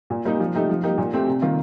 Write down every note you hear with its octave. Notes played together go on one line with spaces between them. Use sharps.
A#2
G3 A#3 D#4
F3
A3 D#4 G4
F3
A#3 D#4 G4
A#2
A3 C4 G4
C3
D#3 A#3 F4